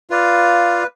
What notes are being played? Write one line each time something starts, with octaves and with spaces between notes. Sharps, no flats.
F4 B4 D5 F5